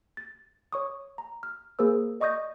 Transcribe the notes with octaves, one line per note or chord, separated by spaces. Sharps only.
A6
C#5 C#6 D#6
A#5
F6
A#3 G#4 A#4 C5 E6
D5 D#5 C#6 D#6 G6 A#6